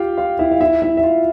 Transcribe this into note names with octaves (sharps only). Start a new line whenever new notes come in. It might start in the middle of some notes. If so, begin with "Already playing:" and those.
Already playing: F4 G4 F5 G5
F4 F5
E4 E5
F5
E4 E5
E4 E5
E5
F4 F5